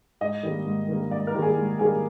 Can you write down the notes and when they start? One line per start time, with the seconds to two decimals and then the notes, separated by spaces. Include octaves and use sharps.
0.21 G#2 D#5
0.43 D#3 G3 A#3
0.65 G#2
0.88 D#3 G3 A#3
1.11 G#2 D5
1.27 A#4
1.34 D#3 G3 A#3
1.42 G#4
1.57 G#2
1.79 D#3 G3 A#3 G#4